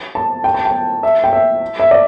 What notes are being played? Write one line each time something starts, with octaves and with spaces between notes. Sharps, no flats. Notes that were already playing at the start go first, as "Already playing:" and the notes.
A5
G5
A5
G5
E5
G5
E5
E5
D5